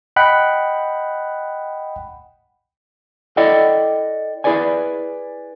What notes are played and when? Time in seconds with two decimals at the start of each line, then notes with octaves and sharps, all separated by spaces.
0.16 D#5 F#5 G5 B5 F#6
3.37 E4 A4 D5 D#5 F#5 G5
4.44 E4 G#4 B4 D5 G#5